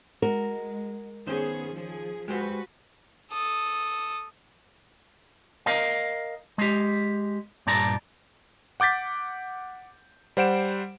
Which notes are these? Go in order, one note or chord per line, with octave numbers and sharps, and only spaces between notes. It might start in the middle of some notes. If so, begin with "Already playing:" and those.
G#3 F#4 A#4
D#3 B3 C#4 G#4 C5
F3 G#4
G#3 F#4 G4 B4 C5
A4 D#6
A#4 D#5 F5
G#3 G4
G2 A#2 D5 A5 A#5
F#5 D6 G6 A6 B6
G3 C5 F#5 D7 E7